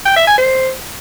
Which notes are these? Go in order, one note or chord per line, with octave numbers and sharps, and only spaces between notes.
G5
E5
G#5
C5